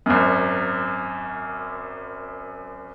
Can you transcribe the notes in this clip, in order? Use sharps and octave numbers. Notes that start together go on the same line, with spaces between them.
G#1 F#2